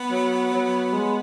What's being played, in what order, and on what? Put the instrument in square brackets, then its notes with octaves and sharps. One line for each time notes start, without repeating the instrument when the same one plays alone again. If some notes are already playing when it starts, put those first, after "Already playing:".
Already playing: [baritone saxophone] B3
[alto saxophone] F#3
F#3
G#3